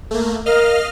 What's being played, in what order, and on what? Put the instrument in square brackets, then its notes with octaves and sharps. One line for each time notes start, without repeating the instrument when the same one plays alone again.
[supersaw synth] A3 A#3
[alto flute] A#4 [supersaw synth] D#5 F5 F6